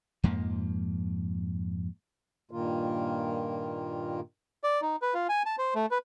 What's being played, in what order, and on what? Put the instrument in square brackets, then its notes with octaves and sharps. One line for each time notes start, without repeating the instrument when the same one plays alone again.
[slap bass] F2 G#2 F3 A#3
[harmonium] G2 A#2 D#3 A#3 F4
[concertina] D5
D#4
B4
F4
G#5
A5
C5
A3
B4